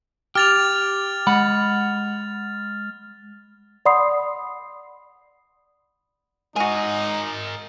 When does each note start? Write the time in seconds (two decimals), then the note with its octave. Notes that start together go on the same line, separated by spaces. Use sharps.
0.35 G4 F6 A6 F7
1.27 G#3 F#5 B5
3.86 D5 F#5 B5 C6 D#6 C7
6.56 G#3 D#4 F#4 G#4 A#4 G#5